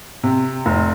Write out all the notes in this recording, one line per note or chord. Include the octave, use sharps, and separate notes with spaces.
C3
F1